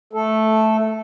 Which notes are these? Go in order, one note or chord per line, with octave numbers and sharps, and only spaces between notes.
A3 A4